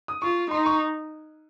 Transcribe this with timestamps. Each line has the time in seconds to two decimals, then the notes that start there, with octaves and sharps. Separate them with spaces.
0.08 D#6
0.22 F4 C#6
0.51 D#4 C6
0.66 C#6